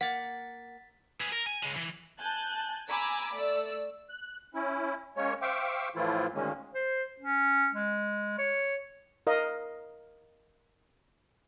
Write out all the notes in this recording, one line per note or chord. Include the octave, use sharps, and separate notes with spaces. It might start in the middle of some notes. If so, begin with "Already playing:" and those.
A#3 F#5 A6 B6
G#4 B4
A#4
G#5
C#3 G#3
E3
G#5 A5 F#6 G6
G#5 A#5 B5 D6 E6
A3 D5 E6
F#6
C#4 E4
G#3 A#3 C#4 C#5
C5 E5 F5 G5 C#6 D6
A2 E3 F3 A3 E4 F4
D2 A#2 D#3 G#3 A#3 C#4
C5
C#4
G#3
C#5
A#4 D#5 F5